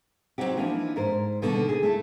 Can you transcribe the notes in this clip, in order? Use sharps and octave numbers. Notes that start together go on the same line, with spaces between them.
F#3 C4 C#4 D#4 F#4 G4
E3 F3 A#3 D4 D#4
G#2 A#4 C5
B2 D3 D#3 G3 A#3 B3
G#4
A3 E4